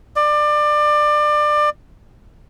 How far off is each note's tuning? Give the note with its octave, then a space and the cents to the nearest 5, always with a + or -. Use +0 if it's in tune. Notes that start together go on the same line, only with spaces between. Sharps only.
D5 +25